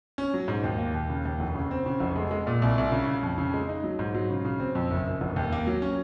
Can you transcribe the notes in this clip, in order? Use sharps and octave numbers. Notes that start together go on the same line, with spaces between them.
C#4
F#3
G#2
D#2
A#3
D#2
C#3
D#2
F1
C#3
C4
C#3
F1
G#3
G#3
A#2
C2
C2
C#3
C#3
F2
C#3
G#3
D#4
F#3
G#2
F#3
C#3
C#3
C4
F2
F#1
F#1
F1
D#2
A#3
F#3
C#4